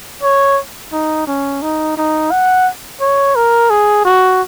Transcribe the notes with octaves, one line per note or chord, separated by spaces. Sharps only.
C#5
D#4
C#4
D#4
D#4
F#5
C#5
A#4
G#4
F#4